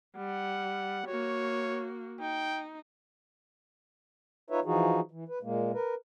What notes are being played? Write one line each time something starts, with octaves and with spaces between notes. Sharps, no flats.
G3 F#5
A#3 F#4 C#5
D#4 G5
D#4 F4 B4 C#5 E5
E3 F3 D#4 F4 F#4 G#4
E3
B4
A#2 G#3 A#3
A#4 B4